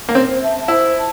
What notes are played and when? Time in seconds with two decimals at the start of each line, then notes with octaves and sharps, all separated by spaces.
0.09 A#3
0.14 C4 C5
0.42 E5 A5
0.68 E4 C5
0.95 A5